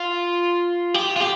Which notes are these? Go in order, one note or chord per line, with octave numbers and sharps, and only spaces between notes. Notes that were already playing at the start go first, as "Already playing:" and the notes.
Already playing: F4
G4
F4
G4